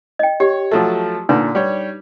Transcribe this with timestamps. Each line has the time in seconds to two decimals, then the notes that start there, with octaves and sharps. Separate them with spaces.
0.19 D#5 G5
0.40 G4 C#5
0.71 F3 F#3 A3
1.29 A#2 D3 D4 D#4 B4
1.55 G3 C#5